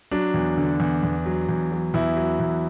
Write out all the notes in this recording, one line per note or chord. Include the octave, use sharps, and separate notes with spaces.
F#3 D4
E2
D3
E2
E2
F#3
E2
F#3
E2 E4
F#3
E2